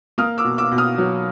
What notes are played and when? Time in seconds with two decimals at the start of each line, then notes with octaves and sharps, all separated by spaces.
0.18 A#3 D#6 F6
0.38 D6 E6
0.45 B2
0.58 D6 E6
0.71 B2
0.78 D#6 F6
0.98 F#3